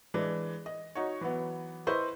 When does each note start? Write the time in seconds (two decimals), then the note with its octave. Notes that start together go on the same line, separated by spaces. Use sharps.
0.14 E3 G#3 D4
0.66 D#5
0.95 D#4 F#4 C#5
1.21 E3 F#3 B3
1.87 E4 B4 C5 D#5 C6 C#6